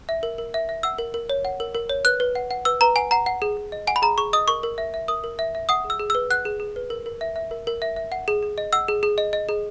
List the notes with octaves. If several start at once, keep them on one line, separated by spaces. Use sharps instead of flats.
E5
A#4
A#4
E5
E5
F#5 E6
A#4
A#4
C#5
F#5
A#4
A#4
C#5
B4 F#6
B4
F#5
F#5
B4 E6
B4 A#5
F#5 G#5
F#5 A#5
F#5
G#4
G#4
D#5
F#5 G#5
B5
G#4 A#5
G#4 C#6
D#5 D#6
A#4 C#6
A#4
E5
E5
A#4 D#6
A#4
E5
E5
F#5 D#6
G#4
E6
G#4
B4 E6
F#5 F#6
G#4
G#4
B4
A#4
A#4
E5
E5
A#4
A#4
E5
E5
F#5
G#4
G#4
D#5
F#5 E6
G#4
G#4
D#5
D#5
G#4